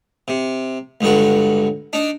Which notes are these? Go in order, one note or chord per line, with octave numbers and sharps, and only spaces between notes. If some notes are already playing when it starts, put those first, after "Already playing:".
C3
C#2 G2 D3 F#4
D4 D#4